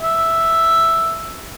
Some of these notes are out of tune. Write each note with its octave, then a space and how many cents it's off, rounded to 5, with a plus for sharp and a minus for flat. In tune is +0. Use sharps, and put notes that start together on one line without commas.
E5 +0